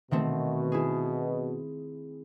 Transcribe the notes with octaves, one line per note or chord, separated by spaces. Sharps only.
B2 D#3 A3 C4
E4 G#4